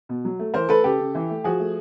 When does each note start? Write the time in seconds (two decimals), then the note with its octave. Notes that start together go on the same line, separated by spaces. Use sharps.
0.09 B2
0.25 F#3
0.39 A3
0.54 E3 A#4 C5
0.69 A3 A4 B4
0.84 C#3 G4 A4
1.00 C#3
1.15 E3
1.30 A3
1.44 F3 F#4 G#4
1.59 A3